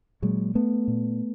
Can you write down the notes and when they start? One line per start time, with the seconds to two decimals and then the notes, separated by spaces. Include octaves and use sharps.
0.22 A#2 F#3 G#3
0.55 A3 B3
0.88 A#2